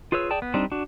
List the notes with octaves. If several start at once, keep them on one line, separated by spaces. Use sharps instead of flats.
F4 G#4 B4 C#5 E6
G#4 D5 G5 A5
B3
G3 C4 D4 D#4
D4 F#4